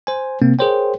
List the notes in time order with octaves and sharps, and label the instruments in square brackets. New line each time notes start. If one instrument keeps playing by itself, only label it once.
[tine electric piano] C5 G#5
C3 A#3 C4
G#4 A#4 C5 C#5 G5